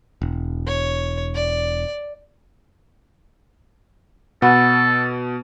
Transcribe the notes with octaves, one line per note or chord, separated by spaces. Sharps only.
E1
C#5
D5
B2 B3 A4